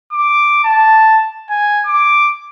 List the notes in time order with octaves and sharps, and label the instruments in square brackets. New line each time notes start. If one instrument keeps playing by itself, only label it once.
[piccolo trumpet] D6
A5
G#5
D6